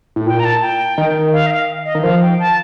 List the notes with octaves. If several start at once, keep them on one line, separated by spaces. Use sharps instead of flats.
A2
A#2 G5
A#5
A5
G5
D#3
F5
D#5
F5
D#5
D#3
F3 F5
G5
A5